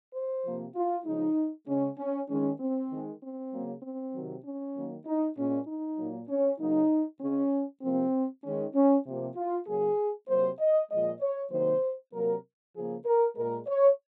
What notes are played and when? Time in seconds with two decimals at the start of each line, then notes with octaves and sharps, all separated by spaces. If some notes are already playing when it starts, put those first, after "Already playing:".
0.14 C5
0.45 C3 F3 A#3
0.75 F4
1.05 C#3 F3 G#3 D#4
1.67 C#3 G#3 C#4
1.98 C#4
2.29 D#3 G#3 C#4
2.60 C4
2.91 D#3 G#3
3.21 C4
3.52 C#3 F#3 A#3
3.82 C4
4.13 C3 D#3 F#3
4.44 C#4
4.75 D#3 F#3 A#3
5.05 D#4
5.37 A#2 G#3 C#4
5.67 D#4
5.98 A#2 F#3 A#3
6.29 C#4
6.59 C#3 F#3 A#3 D#4
7.21 C#3 G#3 C#4
7.82 C3 F3 A#3 C4
8.44 D#3 G#3 C#4
8.75 C#4
9.05 C3 F3 A#3
9.36 F4
9.67 C#3 F#3 A#3 G#4
10.28 C3 F#3 A#3 C5
10.59 D#5
10.90 A#2 F3 G#3 D#5
11.20 C#5
11.51 C3 D#3 F#3 A#3 C5
12.13 C3 F#3 A#3 A#4
12.75 C#3 F3 A#3 G#4
13.05 A#4
13.36 A#2 G#3 A#4
13.67 C#5